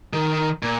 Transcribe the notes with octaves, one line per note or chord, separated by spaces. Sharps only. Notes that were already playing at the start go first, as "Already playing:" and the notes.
D#3
A#2